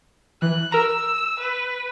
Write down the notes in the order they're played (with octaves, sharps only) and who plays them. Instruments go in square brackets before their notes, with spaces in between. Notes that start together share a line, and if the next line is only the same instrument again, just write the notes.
[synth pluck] E3 [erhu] F#6
[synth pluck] A#4 A#5 [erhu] E6
[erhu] B4